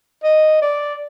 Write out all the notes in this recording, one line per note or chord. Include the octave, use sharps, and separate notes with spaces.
D#5
D5